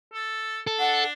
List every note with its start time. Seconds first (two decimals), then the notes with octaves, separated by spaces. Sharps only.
0.14 A4
0.67 A4
0.80 D4 F#5